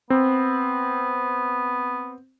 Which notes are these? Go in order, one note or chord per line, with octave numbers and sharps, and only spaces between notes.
B3 C4